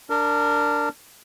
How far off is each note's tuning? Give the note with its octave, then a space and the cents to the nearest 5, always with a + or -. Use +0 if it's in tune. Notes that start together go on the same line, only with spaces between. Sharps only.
D4 +0 A#4 -20